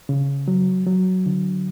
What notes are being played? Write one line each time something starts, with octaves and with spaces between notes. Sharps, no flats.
C#3
F#3
F#3
D3